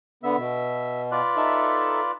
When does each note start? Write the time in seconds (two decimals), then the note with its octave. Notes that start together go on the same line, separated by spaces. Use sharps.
0.23 D3 B3 E5
0.37 B2
1.12 F4 B4 D5
1.37 D#4 A4 E5